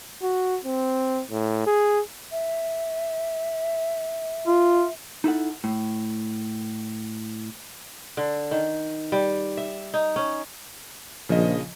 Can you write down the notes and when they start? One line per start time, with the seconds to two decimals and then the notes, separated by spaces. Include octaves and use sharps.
0.22 F#4
0.65 C4
1.31 A2
1.67 G#4
2.32 E5
4.47 F4
5.24 D#4 E4 A4 F#5
5.64 A2
8.17 D3
8.51 D#3
9.12 G3
9.57 E5
9.94 D#4
10.16 C#4
11.29 A#1 C#3 F3 D#5